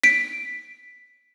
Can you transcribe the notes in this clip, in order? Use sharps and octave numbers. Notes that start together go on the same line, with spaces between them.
B6 D7